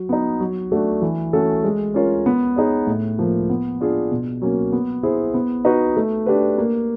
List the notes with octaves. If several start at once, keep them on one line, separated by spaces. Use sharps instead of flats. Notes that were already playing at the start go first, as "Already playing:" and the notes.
Already playing: F#3
B3 D#4
F#3
A3 D4 F#4
E3
A3 C#4 F#4 A4
G#3
C#4 F4 A#4 C#5
B3
D#4 G#4 C#5
A2
F3 A#3
B3
D4 F4 G#4
B2
F#3 A#3 C#4
B3
E4 G#4 C5
B3
D#4 F#4 B4
A3
D4 G4 B4
A#3